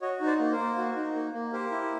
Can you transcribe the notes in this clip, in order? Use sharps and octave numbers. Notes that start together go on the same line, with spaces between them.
F#4 C#5 D#5
D#4
C5 D5
A#3
A#4 C5
A#3
F#4
D#4
A#3
A#3
G4 A#4 C5
E4